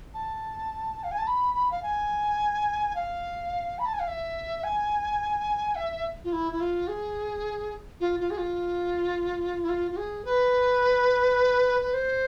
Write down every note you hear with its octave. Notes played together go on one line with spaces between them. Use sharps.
A5
F5
G#5
A5
B5
B5
F5
G#5
F5
B5
A5
G#5
F5
E5
G#5
E5
F4
E4
E4
F4
G#4
F4
F4
G#4
F4
E4
F4
F4
G#4
B4
B4
C5